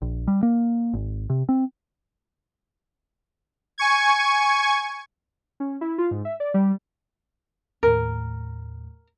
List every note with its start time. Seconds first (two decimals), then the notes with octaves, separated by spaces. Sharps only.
0.02 A#1
0.28 G3
0.43 A#3
0.94 G#1
1.30 C3
1.49 C4
3.78 G#5 C#6 G#6
5.60 C#4
5.81 E4
5.98 F4
6.11 G#2
6.25 E5
6.40 D5
6.54 G3
7.83 D#2 A2 A#4